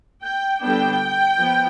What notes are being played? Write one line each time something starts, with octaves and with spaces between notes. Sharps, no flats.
G5
D3 G3 B3 D4 G5
F3 B3